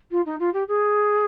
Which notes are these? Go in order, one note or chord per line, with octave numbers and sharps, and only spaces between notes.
F4
D#4
F4
G4
G#4